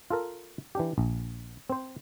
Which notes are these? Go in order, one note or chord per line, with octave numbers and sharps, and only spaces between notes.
F4 A4 A#4
E3 D4 G4
A#1
C4 C5